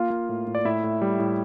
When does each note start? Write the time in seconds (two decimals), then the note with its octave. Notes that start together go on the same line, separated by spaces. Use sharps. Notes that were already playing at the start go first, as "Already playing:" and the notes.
Already playing: A#3 F4 F5
0.10 A#3
0.29 A2
0.47 A2
0.55 D5
0.65 A2 E4 E5
0.84 A2
1.02 G3
1.19 A2